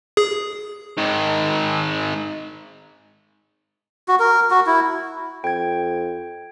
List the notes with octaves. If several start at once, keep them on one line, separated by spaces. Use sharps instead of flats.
G#4
G#2 D#3
F#4
A#4
F#4
E4
F2 G5 G#6